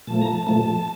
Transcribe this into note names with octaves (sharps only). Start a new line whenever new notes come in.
A#2 F3 A3 A5
A#5
A5
A#2 F3 A3 A5